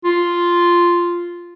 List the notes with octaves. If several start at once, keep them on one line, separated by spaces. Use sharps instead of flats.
F4